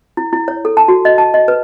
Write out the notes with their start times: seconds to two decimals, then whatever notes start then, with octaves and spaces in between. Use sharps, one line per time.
0.17 E4
0.33 E4
0.48 C#5
0.65 A4
0.77 A5
0.88 F#4
1.05 D#5
1.18 A5
1.34 D#5
1.48 B4